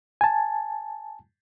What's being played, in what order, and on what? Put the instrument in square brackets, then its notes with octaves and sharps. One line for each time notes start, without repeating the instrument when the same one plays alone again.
[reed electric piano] G#5 A5